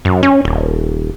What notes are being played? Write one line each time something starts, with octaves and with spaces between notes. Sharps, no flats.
F#2
C#4
D#1